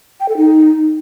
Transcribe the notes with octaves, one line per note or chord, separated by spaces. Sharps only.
G5
A4
D#4